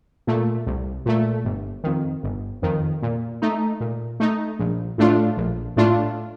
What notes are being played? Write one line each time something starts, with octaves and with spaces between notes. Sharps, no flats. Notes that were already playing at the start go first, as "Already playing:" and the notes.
A#2 A3
C2
A#2 A3
G1
F2 D#3
G1
F2 D#3
A#2
A3 D#4
A#2
A3 D#4
A#1
A2 A3 D4 F4
A#1
A2 A3 D4 F4